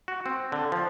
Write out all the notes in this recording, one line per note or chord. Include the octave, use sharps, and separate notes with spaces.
F#4
C4
D3
F3